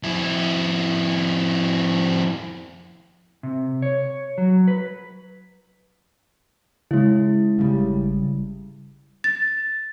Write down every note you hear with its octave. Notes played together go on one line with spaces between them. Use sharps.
F2 E4
C3
C#5
F#3
B4
C#3 G#3 E4
G#1 C#3 G3
A6